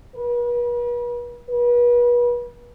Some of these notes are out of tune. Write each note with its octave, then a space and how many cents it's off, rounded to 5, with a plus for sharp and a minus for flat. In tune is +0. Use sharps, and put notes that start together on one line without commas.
B4 -40
B4 -35